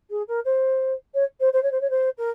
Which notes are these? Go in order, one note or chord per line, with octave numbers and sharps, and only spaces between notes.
G#4
A#4
C5
C#5
C5
C5
C#5
C5
C#5
C5
A#4